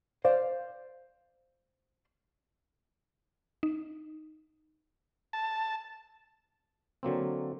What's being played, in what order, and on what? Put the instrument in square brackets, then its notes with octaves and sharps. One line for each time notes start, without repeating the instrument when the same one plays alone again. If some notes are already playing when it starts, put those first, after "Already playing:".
[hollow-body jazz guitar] C5 D5 F5
[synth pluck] D#4
[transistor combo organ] A5
[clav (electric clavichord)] D3 F#3 A#3 C4